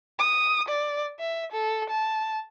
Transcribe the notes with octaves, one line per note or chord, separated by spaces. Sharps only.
D#6
D5
E5
A4
A5